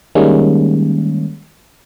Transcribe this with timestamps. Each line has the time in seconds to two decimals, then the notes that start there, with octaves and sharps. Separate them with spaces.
0.15 D#3 G3 G#3 A#3 C#4